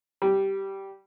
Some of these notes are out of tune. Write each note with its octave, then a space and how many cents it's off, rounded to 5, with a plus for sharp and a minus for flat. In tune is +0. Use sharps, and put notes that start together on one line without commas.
G3 -5